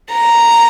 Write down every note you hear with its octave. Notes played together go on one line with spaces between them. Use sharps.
A#5